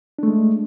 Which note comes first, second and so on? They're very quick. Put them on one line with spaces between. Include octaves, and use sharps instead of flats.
D4 A3 G#3